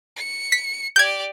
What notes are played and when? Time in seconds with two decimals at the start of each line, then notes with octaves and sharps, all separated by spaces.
0.16 C#7
0.52 B6
0.96 G4 D5 G6 G#6